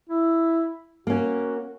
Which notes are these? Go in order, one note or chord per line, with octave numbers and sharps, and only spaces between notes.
E4
A#3 C#4 F#4